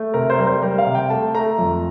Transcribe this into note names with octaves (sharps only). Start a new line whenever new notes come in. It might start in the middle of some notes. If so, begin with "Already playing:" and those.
Already playing: A3
C3 A#4
C5
G3 A#4
C5
G3 A#4
F5
C3
G5
A3 A5
A3 A#5
F2